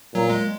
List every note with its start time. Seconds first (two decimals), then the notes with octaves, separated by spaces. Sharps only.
0.15 A#2 F#3
0.30 G#3